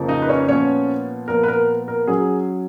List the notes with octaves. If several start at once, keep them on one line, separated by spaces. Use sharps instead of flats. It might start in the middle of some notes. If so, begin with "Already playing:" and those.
Already playing: F2 C#3 F3 A#3
D#4 D#5
B4
C#4 C#5
A#2 F3 B3 C#4 C#5
A#2 F3 B3 A#4
B4
A#4
A#4
F#3 C#4 G#4